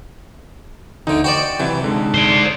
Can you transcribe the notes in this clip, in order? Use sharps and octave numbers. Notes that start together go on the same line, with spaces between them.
D2 D3 D#4
F#4 C5 D5 D#5 G5
C3 E3 F#3 B4
D3 G#3 D#4 A4
C5 D5